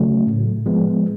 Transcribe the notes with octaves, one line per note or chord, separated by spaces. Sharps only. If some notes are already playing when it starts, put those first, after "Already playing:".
Already playing: C#3 F#3 A3
A2
F3 G#3 B3